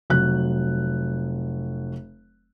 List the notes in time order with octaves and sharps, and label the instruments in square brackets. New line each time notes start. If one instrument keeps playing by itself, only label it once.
[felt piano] F1 F#3 F#6